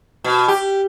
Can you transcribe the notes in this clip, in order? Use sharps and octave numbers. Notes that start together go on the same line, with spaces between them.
B2
G4